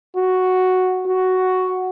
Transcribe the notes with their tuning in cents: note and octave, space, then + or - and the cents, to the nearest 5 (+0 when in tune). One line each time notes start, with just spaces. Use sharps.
F#4 +0
F#4 +5